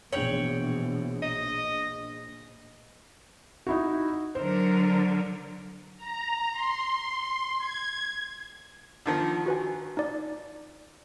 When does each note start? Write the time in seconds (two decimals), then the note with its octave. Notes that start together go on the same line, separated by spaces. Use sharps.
0.13 A#1 B2 E3 C#5 G5 F7 F#7
1.23 D#5
3.67 D#4 E4 F#4
4.35 D3 F#3 A#4 C5
5.97 A#5
6.52 C6
7.58 G#6
9.06 D3 D#3 F3
9.46 F#4 B4 G#5
9.97 D#4 D5